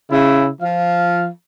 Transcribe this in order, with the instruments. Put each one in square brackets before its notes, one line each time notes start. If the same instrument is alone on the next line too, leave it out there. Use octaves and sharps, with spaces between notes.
[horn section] C#3 E4
F3 F5